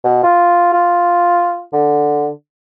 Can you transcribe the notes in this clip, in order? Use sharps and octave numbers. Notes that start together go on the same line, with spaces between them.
B2
F4
F4
D3